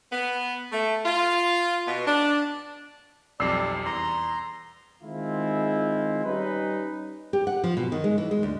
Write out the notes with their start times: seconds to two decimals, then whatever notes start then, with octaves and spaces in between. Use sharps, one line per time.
0.12 B3
0.72 A3
1.05 F4
1.86 B2
2.06 D4
3.40 B1 F2 G3 D5 E6 C7
3.86 E2 A#5 C6
5.03 D#3 G#3 C4 E4 F4
6.25 G3 C#4 D#4 B4
7.33 G4
7.47 F#5
7.64 F3
7.77 B2
7.92 D#3
8.04 G#3
8.18 E3
8.31 G#3
8.43 D2